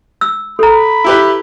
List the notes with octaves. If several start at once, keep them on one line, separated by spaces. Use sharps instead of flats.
E6
A4 A#5 B5
E4 G4 B4